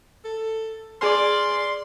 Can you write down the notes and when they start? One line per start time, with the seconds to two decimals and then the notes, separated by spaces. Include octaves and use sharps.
0.25 A4
1.01 G#4 D5 G#5 C6 F6